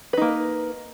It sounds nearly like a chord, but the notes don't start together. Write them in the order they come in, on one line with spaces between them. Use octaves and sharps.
B4 D#4 A#3